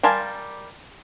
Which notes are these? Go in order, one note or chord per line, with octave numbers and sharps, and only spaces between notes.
G3 A#4 F5 G#5 A5 C6